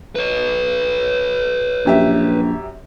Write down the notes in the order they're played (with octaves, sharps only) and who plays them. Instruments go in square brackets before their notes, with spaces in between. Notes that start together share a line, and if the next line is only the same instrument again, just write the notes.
[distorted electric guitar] B4 C#5
[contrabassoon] A#1 [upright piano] F#2 G4 E5